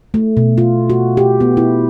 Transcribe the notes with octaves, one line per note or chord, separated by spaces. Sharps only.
A3
B2
F4
F#4
G4
B3
E4